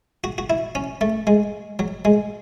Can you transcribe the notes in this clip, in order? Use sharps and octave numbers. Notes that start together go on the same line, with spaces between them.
F#4
F#4
E4
C#4
A3
G#3
F#3
G#3